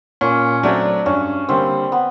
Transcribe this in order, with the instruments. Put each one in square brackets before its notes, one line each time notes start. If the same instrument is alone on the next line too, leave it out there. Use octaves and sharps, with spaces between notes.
[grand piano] A#2 [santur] C#4
[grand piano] F#3 A3 C4 [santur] D4
[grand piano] G2 [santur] C#4
[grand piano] D3 G3 A#3 [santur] C4
[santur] B3